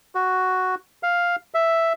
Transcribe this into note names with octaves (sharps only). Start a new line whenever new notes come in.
F#4
F5
E5